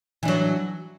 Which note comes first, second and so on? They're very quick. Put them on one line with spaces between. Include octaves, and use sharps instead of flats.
E3 D4 F#3